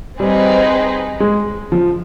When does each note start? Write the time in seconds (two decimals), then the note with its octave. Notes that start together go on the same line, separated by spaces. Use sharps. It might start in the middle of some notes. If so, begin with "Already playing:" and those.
0.19 G3 C4 D#4 G#4 B4
1.20 G#3
1.72 F3